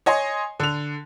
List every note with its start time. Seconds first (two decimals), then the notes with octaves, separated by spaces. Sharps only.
0.06 C#5 D#5 G#5 C6
0.60 D3 F7